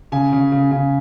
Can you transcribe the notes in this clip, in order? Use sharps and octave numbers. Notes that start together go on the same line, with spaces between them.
C#3 G#5
C#3
C#3
C#3